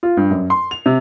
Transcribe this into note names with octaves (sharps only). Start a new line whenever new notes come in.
F4
G2
F#2
C6
F7
C3